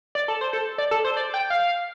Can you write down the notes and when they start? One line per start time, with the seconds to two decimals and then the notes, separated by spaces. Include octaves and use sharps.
0.15 D5
0.28 A4
0.41 C5
0.53 A4
0.78 D5
0.91 A4
1.04 C5
1.17 D5
1.34 G5
1.50 F5